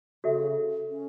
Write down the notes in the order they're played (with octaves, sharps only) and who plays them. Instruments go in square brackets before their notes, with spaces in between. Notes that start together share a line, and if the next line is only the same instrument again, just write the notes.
[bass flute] C#3 [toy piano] F#4 A4 E5
[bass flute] C#4